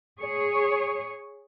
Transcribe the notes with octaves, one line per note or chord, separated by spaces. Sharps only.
G#4 C#5